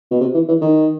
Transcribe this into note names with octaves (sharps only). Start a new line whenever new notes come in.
B2
C3
E3
E3
D#3